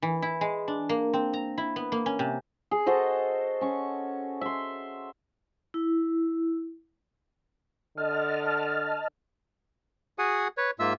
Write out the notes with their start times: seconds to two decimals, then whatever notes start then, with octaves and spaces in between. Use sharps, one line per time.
0.02 E3
0.22 E4
0.41 G#3
0.68 D4
0.89 A#3
1.13 C4
1.33 A#5
1.58 E4
1.76 B3
1.92 A#3
2.06 C#4
2.19 C3
2.71 G#4
2.86 F#4 A4 C5 D#5
3.61 C#4 C#6
4.41 E5 C6
5.74 E4
7.97 D3 D#5 A5 F6
10.19 F#4 G#4 F#5 G#5 D#6
10.57 B4 C#5
10.79 G#2 A#3 F4 E5 E6